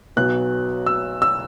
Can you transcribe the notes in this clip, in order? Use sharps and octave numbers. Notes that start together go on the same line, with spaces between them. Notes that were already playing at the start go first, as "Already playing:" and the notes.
B1 B2 F#3 B3 F#6
E6
E6